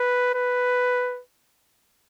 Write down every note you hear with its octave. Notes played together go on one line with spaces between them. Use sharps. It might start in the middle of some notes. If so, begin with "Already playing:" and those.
Already playing: B4
B4